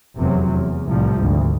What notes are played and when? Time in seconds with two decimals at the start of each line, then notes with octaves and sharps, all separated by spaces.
0.17 F1 E2 C3 F#3
0.49 E2
0.87 C2 A2 C3 F3 G3
1.18 G#1 D2